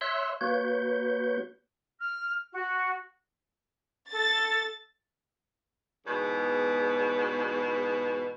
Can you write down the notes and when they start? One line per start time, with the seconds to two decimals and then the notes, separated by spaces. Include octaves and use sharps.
0.01 C#5 E5 C6 E6 F#6
0.41 A#3 F#4 B4 C#5 G6
2.00 F6
2.53 F#4
4.12 A4 A6
6.06 E2 G#2 B2